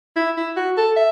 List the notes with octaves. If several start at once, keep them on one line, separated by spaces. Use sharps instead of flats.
E4
E4
F#4
A4
E5